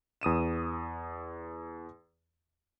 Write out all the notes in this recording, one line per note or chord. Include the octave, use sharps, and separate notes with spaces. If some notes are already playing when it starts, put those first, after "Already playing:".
E2 D#6 D#7 E7